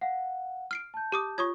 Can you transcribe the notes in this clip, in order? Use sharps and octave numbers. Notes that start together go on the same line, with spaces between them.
F5 F#5
F6 C7 D7
A5 G6
G4 D6 D#6
F4 C#5 C#6 D#6 G#6